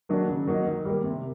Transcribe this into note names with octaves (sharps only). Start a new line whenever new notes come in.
D#3 F#3 A#3 D4
C#3
F#3 A#3 D#4
D#3
G3 A#3
C3